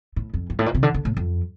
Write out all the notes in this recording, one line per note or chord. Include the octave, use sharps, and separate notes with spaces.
A2
F2
G2
A2
A#2
C3
D3
D3
A2
F2